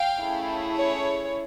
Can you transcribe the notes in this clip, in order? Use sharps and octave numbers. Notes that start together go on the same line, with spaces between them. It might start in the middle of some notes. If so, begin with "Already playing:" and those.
Already playing: F5 G5
A3 C#4 E4 G#4
C#5